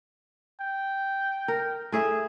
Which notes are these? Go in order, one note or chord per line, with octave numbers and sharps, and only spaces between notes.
G5
A#4
A2 G#4 E5